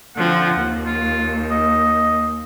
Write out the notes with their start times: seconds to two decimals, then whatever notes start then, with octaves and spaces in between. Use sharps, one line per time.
0.15 D3 F3 C4 F#5
0.53 D#2
0.86 F4
1.50 D#5